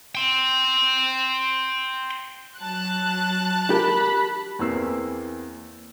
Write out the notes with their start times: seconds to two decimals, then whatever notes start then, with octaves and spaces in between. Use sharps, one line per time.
0.15 G5 C6
2.58 F#3 A5 F#6
3.70 G4 A#4 B5
4.59 E2 E3 A#3 C4 E6 C7